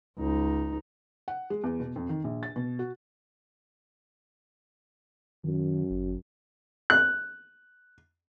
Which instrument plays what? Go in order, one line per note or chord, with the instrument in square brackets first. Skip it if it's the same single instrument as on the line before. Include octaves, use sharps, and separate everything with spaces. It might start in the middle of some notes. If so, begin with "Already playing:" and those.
[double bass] C#2 D#4
[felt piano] F#5
G#3
E2
B2
F2
D#3
A#1
A6
B2
F#4
[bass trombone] F#2 [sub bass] D#3
[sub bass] G1
[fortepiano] F#6